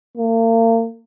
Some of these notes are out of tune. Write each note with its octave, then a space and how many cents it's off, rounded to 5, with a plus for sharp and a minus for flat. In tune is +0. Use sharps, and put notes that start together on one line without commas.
A#3 -40